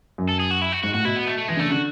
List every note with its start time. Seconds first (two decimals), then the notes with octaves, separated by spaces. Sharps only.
0.18 F#2
0.29 A4
0.40 G#4
0.51 F#4
0.61 E4
0.72 F#4
0.83 G#2 F#4
0.94 A2 F#4
1.05 B2 E4
1.17 B3
1.27 A3
1.38 A3
1.48 E3 G#3
1.57 D3 A3
1.64 C#3
1.71 D3 F#4